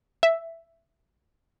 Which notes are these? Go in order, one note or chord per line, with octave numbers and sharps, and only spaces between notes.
E5